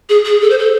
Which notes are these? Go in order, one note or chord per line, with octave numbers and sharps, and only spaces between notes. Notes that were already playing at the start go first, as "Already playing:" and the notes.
G#4
G#4
A4
C5
A4